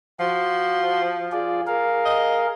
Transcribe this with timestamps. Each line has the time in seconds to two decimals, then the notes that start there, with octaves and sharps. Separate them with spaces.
0.20 F3 F#4 C6
1.32 F4 G#4 D5
1.67 G#4 A#4 F5
2.05 D#5